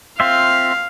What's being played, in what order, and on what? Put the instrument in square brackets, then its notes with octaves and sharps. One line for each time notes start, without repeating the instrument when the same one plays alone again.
[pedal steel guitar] C4 F4 E5 [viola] F5